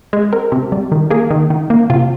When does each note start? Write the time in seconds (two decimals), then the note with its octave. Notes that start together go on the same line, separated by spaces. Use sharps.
0.13 G#3
0.33 C4 A#4
0.52 C3
0.72 G3
0.92 D#3
1.10 A#3 G#4
1.31 D#3
1.50 D#3
1.70 A#3
1.90 C3 F4